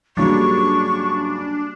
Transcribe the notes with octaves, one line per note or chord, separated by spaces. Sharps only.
G#2 C#3 F#3 G3 A#3 D4 F#4 C#6